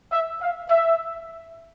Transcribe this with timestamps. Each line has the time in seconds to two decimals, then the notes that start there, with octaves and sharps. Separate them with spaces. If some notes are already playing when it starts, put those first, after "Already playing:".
0.11 E5
0.42 F5
0.70 E5